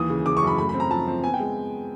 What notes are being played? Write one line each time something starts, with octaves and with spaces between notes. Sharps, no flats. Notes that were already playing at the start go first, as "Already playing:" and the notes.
Already playing: D#2 E3 D#6
C#3
C#3 D6
C#6
F#2 B5
A3 B5
B5
C4
A#5
F3 A5
C4
B3 G#5
G5
G#3